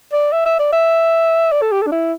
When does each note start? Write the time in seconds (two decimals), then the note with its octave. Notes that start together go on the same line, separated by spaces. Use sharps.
0.13 D5
0.33 E5
0.46 E5
0.59 D5
0.73 E5
1.52 D5
1.62 A4
1.72 G4
1.82 A4
1.87 D4
1.92 E4